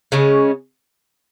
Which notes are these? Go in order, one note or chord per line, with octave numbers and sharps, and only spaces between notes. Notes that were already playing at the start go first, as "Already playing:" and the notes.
C#3 G#3 C#4